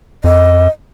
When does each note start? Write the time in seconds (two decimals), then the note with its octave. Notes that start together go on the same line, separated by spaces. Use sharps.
0.24 F2 D#5